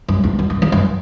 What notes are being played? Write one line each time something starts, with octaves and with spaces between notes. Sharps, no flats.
F#2
E2
F#2
F#2
E2
F#2